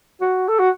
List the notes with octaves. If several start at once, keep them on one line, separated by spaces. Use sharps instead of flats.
F#4
A4
F#4